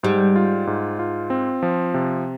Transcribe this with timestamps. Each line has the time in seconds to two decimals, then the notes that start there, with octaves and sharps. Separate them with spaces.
0.03 G#2 G3
0.36 F4
0.67 G#2
0.99 F4
1.30 C4
1.63 F3
1.94 C3